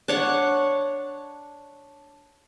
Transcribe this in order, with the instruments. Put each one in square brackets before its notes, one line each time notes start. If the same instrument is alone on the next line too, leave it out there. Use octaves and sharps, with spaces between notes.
[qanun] D4 C#5 F#5